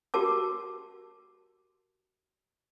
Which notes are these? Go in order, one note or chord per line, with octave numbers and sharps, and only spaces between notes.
F#4 G4 A#4 A5 D6